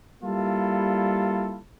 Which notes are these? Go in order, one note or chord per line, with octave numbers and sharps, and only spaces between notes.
G3 A#3 E4 F4 A4